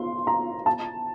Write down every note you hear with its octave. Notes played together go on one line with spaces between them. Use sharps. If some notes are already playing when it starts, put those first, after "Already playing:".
Already playing: C6
A#5
A5